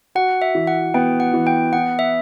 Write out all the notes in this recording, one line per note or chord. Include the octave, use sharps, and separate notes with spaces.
F#4 F#5
E5
E3
F#5
B3 G5
F#5
E3
G5
B3 F#5
E5